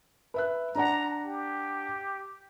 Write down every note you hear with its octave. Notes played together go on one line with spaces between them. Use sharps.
B4 E5 F#6
D4 D5 F#5 A#5
G4